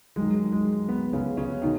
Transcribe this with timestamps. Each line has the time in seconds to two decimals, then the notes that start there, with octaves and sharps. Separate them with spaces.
0.16 F#2 D#3 G#3
0.52 G#3
0.88 B3
1.13 C#3 C#4
1.37 C#3 C#4
1.62 B2 D#3 D#4